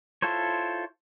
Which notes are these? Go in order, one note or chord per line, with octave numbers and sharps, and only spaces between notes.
E4 F4 A4 C5 C#5